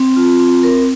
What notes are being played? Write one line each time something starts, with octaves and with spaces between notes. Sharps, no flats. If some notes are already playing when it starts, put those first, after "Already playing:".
Already playing: C4
F4
C4
A#4